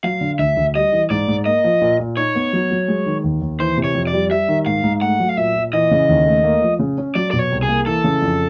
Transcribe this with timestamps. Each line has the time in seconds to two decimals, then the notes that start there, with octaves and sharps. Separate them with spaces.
0.03 F#3 F5
0.21 D3
0.39 D2 E5
0.57 D2
0.75 G3 D#5
0.93 E3
1.10 G#2 D5
1.28 G#2
1.46 A#3 D#5
1.64 F3
1.82 A#2
1.99 A#2
2.17 D#4 C#5
2.35 B3
2.53 F#3
2.71 F#3
2.88 G#3
3.06 D#3
3.24 D#2
3.42 D#2
3.60 E3 C5
3.78 C3
3.84 C#5
3.95 F2
4.07 D5
4.13 G3
4.31 G3 E5
4.49 D#3
4.66 G#2 F5
4.84 G#2
5.02 A3 F#5
5.20 F#3
5.29 F5
5.37 A#2 E5
5.55 A#2
5.73 E3 D#5
5.91 C#3
6.09 D#2
6.26 A3
6.44 A#3
6.62 F3
6.79 C#3
6.98 C#4
7.15 F#3 D5
7.31 B2 D5
7.39 C#5
7.51 C2
7.63 G#4
7.68 A#3
7.86 E3 A4
8.04 C#3
8.22 F2